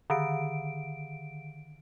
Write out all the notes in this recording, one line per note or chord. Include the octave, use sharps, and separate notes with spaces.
D3 D#3 D7